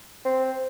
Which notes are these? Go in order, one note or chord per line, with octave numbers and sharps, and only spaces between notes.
C4